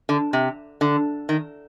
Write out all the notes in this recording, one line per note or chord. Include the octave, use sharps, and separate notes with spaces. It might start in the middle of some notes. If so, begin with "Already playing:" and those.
D3
C3
D3
D#3